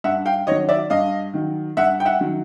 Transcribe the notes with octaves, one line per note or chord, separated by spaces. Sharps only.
G2 E5 F#5
F5 G5
D#3 F#3 C#5 D#5
D5 E5
G2 D#5 F5
D#3 F#3
G2 E5 F#5
G5
E5 F#5
D#3 F#3